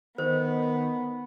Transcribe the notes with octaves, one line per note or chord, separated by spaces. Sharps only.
D#3 B3 C5